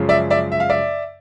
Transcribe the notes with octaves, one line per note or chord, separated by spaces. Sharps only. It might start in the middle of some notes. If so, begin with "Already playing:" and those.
Already playing: F#2 C#3 F3 G#3
D5 E5
D5 E5
E5
F5
D5 E5